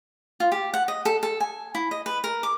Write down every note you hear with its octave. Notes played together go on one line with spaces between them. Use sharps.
F4
G4
F#5
D#5
A4
A4
G#5
E4
D#5
B4
A#4
D6